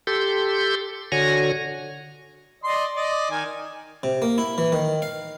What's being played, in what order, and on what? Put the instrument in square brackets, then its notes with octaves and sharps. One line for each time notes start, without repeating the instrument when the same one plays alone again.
[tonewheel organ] G4 A4 C6 G6
D3 F#4 C#5 G#5 A#6
[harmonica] D5 D#5 C6
D5 D#5
D#3 G#5
[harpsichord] C3
A#3
E4
E3
D#3
F5